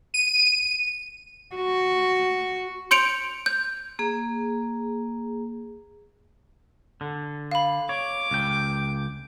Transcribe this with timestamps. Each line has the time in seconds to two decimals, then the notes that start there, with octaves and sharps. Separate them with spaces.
0.14 D#7
1.55 F#4
2.91 C6 G6 C#7 D7 F7
3.46 G6
3.99 A#3 G#4
7.01 D3
7.51 F5 B5
7.89 C#5 D6
8.31 C#2 G5